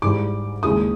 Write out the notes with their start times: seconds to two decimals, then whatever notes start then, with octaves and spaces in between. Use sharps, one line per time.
0.02 G#2 E3 G3 D6
0.63 D#2 C#3 E3 G#3 D#6